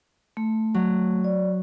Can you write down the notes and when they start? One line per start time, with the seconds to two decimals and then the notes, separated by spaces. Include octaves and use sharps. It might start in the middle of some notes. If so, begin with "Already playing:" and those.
0.37 A3
0.74 F#3
1.24 D5